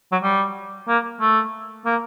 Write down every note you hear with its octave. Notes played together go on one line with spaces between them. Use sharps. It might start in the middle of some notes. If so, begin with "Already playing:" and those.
F#3
G3
A#3
A3
A#3